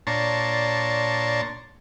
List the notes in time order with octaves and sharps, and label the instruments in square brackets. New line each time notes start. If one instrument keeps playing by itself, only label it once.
[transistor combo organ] A#2 D4 C#5 A5 A#5 C6